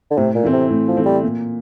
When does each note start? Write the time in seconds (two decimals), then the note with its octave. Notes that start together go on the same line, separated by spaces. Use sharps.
0.11 D3
0.17 A2 C3
0.35 A#2
0.44 E3 A3 C4
0.53 C3
0.71 A2
0.88 F3
0.97 E3 A3 C4
1.06 G3
1.23 A#2